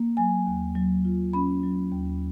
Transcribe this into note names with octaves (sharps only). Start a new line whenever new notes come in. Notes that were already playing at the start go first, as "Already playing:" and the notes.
Already playing: A#3
F#3 G#5
D#2
F#3
F4
C#4 B5
F#3
D#2